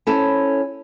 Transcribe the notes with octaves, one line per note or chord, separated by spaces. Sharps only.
C#4 E4 A4 C5